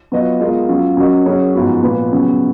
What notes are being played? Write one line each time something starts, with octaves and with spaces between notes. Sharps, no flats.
F#3 B3 F4 B4 D#5
G#3 B3 F4 A#4 D#5
F#3 C#4 F4
F#3 C#4 F#4 A#4 D#5
F#3 C#4 G#4 C#5
G#2 F3 B3 F#4
A#2 F3 B3 F4 B4
C#3 F#3 B3